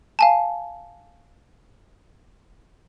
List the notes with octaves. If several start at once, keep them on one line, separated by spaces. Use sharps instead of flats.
F5 G#5 A5